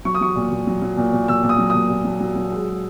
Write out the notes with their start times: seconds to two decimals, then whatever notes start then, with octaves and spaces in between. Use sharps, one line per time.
0.05 F#3 C#6
0.15 D#6
0.21 F#3 C#6
0.36 A#2
0.51 A#2
0.67 F#3
0.82 F#3
0.97 A#2
1.13 A#2
1.28 A#2 E6
1.43 A#2
1.49 D#6
1.58 F#3
1.70 A#2 D#6
1.90 A#2
2.05 F#3
2.21 F#3
2.36 F#3
2.52 G#3
2.66 G#3